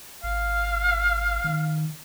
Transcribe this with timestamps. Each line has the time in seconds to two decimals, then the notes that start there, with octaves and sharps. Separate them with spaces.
0.24 G#1 F5
1.44 D#3